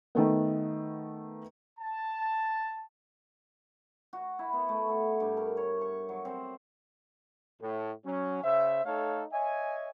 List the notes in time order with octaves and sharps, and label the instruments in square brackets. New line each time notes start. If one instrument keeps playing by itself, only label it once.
[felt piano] D#3 A3 B3
[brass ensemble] A5
[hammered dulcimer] F#4
E4
B3
A3
A4
G2
A#4
C#5
C#6
F#3
C4
[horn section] A2
F#3 C#4
C#3 C5 E5
A3 D#4 A4 C#5 F5
C#5 D#5 E5 G#5